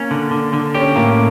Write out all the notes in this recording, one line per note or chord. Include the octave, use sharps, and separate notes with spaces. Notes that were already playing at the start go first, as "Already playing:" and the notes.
Already playing: A#3 C#4
D3
D3
D3
C#4 G4
A2 A#3